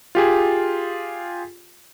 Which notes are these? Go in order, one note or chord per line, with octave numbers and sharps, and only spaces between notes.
F4 G4 G#4